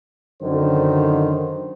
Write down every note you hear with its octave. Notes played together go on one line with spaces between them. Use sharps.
F#2 D3 D#3 C5